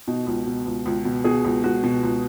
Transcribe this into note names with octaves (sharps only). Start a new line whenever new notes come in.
B2 D#4
C#2
B2
C#2
C#2
B2
B2 G#4
C#2
C#2 F#4
B2
C#2